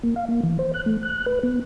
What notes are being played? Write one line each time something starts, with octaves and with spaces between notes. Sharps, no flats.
A#3
F5
A#3
E3
C5
F#6
A3
F#6
B4
B3